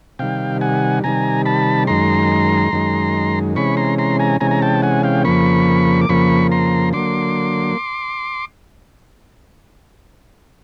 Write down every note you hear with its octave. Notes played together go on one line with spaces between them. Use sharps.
C3 D#3 G3 F5 G5
F#5 G#5
C3 D#3 G3 G#5 A#5
A5 B5
F#2 D#3 G#3 A#5 C6
F#2 D#3 G#3
C3 E3 G#3 C#4 B5 C#6
A#5 C6
A#5 C6
G#5 A#5
C3 E3 G#3 C#4 G#5 A#5
A#5
G5 A5
F#5 G#5
F5 G5
F2 C#3 F3 A#3 B5 C#6
D6
F2 C#3 F3 A#3 B5 C#6
A#5 C6
D3 F#3 A#3 C6 D6